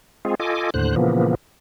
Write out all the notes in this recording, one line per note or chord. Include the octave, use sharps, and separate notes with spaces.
G#3 C4 F4 G#4
F4 A4 D#5 G#5 D6
D#2 A2 D3 C5 F#6
A#2 C#3 E3 F3 A#3 B3